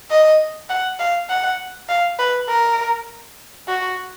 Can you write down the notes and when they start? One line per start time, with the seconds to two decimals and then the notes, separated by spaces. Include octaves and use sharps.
0.10 D#5
0.69 F#5
0.99 F5
1.29 F#5
1.89 F5
2.19 B4
2.49 A#4
3.68 F#4